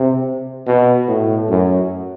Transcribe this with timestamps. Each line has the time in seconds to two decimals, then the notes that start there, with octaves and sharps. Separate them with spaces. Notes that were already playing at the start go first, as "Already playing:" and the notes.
Already playing: C3
0.67 B2
1.08 A2
1.50 F#2